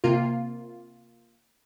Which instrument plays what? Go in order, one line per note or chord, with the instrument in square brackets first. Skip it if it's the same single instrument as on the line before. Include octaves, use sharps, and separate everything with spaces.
[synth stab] C3 A#3 F4